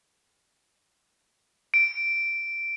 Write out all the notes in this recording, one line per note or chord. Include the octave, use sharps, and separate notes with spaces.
D7